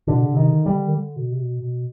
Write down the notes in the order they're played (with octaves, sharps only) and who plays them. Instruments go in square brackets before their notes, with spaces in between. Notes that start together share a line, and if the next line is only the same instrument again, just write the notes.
[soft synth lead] B2 [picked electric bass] D3
[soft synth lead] C#3
C3
[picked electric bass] D#3
[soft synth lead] D3
[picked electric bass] G3
[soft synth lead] D3
D#3
D3
B2
C3
B2
B2